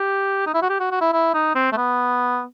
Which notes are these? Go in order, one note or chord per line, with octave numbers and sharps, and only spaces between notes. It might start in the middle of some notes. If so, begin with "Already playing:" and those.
Already playing: G4
D#4
E4
F#4
G4
F#4
F#4
E4
E4
D#4
C4
A3
B3